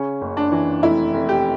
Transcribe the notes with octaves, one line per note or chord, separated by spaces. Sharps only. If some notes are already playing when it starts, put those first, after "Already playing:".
Already playing: C#3 C#4
F#1
D4
E3
F1 E4
F1
G4